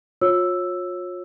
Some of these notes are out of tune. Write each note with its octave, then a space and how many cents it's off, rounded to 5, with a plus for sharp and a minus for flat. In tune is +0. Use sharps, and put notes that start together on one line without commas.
F4 +40 C#5 -25 E6 +0